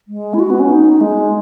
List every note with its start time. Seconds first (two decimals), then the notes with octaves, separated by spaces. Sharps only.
0.08 G#3
0.34 E4
0.40 F#4
0.50 B3
0.60 C#4
0.70 D#4
1.01 G#3